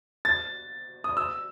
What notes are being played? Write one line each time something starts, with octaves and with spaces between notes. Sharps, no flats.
A6
D#6
E6